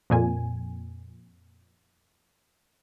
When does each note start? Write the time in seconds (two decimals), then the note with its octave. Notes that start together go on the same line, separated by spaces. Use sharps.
0.10 F2 A#2 G#5